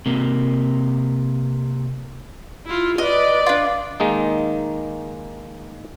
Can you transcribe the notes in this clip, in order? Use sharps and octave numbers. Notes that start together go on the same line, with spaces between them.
C3 A#3
E4 F4
B4 D5 D#5
D4 F4
D#3 G#3 A#3 D#4